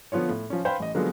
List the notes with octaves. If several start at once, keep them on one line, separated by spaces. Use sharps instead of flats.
D3 F3 B3 F4 C#5
A2
F3 C#4
B4 C5 F5 G5 B5
A1 D#5
D3 F3 F#3 G#3 A#3 B3